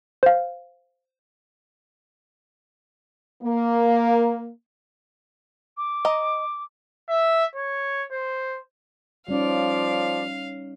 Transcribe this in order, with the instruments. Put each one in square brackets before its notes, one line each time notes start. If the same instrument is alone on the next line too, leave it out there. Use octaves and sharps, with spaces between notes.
[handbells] C5 F5
[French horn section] A#3
[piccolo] D6
[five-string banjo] D#5 A#5
[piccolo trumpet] E5
C#5
C5
[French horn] F3 [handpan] G3 C#4 D#4 [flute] D5 [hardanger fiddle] F5